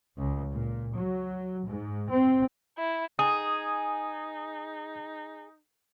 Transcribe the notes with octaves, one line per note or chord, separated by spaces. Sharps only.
C#2
A#2
F#3
G#2
C4
E4
D#4 G#4 D#6